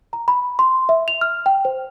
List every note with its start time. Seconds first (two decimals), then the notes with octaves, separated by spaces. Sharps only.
0.13 A#5
0.28 B5
0.59 C6
0.89 E5
1.08 F7
1.21 F6
1.46 G5
1.65 C5